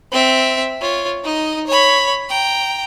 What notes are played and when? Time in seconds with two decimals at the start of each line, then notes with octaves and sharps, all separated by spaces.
0.11 C4 E5
0.81 F4 C#5
1.24 D#4 D#5
1.67 C#5 B5
2.29 G5 A#5